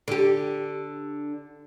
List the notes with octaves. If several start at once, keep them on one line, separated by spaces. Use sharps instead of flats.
D3 G4